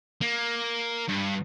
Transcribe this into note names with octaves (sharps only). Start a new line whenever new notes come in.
A#3
G2